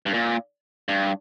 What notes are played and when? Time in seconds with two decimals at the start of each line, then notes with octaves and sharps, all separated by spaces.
0.06 G2
0.14 A#2
0.89 G2